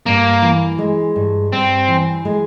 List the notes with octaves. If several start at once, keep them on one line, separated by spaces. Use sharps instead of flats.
G2 A#3
E3
G#3
G2
G2 C4
E3
G#3